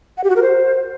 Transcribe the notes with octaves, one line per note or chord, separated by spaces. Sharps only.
F#5
G4
F#4
A#4
C5